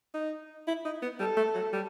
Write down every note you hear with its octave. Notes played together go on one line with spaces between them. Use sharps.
D#4
E4
D#4
B3
G3 A4
A3
F#3
G3